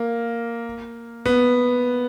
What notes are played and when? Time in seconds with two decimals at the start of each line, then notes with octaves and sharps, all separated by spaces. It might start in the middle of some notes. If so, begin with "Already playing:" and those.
Already playing: A#3
1.26 B3